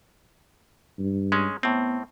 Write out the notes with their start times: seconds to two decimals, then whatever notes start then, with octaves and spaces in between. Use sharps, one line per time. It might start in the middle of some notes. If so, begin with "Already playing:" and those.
0.99 G2
1.32 G#3 C#4
1.63 A2 B3 C4